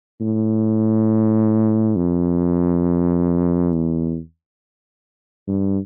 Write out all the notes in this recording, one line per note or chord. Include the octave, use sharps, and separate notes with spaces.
A2
F2
E2
G2